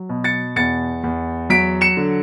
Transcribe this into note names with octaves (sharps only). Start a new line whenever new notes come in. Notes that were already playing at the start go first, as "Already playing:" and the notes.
Already playing: F#3
B2
A6 C#7
E2 A6 C#7
E2
F#3 B6 D7
C#7 E7
D3